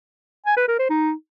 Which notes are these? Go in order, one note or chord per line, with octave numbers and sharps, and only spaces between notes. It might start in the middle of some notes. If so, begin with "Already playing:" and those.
G#5
B4
A#4
C5
D#4